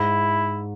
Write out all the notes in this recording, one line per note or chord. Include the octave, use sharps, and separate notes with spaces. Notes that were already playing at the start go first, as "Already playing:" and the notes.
Already playing: G#2 E4